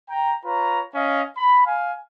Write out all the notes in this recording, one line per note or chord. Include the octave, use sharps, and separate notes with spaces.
G5 A#5
F4 B4 C#5 A#5
C#4 D#5 F5
B5
F5 G#5